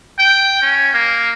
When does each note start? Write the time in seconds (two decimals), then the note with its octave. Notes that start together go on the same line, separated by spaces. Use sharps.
0.19 G5
0.62 C#4
0.94 A#3